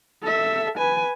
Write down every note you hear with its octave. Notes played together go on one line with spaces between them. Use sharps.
A4 E5
B4 G#5